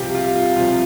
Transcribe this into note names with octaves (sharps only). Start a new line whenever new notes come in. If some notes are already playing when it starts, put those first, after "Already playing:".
Already playing: C2 C3 F3 F4 G4
F4
F4
C2 C3 F3 F4